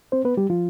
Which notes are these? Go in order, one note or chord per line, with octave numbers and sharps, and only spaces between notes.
C4 C5
B3 B4
G3 G4
F3 F4